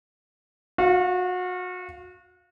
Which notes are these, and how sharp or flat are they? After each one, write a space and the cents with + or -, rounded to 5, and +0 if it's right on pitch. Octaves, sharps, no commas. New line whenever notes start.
F#4 -30 F5 +0